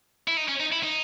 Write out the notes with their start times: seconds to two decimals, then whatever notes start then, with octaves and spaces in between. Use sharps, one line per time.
0.28 E4
0.37 D#4
0.49 C#4
0.60 D#4
0.72 E4
0.83 D#4